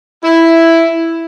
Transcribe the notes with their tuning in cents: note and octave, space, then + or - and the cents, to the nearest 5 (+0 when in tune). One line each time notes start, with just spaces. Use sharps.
E4 +0